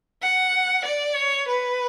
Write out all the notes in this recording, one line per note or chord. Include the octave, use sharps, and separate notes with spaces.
F#5
D5
C#5
B4